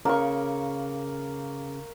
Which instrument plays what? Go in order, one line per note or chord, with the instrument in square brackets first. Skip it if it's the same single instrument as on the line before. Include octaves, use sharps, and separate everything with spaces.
[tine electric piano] C#3 [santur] A#3 C#6